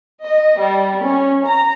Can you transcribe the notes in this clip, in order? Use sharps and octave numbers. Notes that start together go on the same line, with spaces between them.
D#5
G3
C#4
A#5